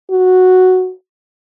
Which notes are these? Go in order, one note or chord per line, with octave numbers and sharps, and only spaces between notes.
F#4